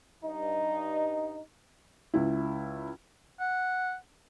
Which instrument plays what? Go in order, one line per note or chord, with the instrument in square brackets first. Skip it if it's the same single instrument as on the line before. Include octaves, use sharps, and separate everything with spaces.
[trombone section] G2 D#4
[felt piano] C#2 E4
[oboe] F#5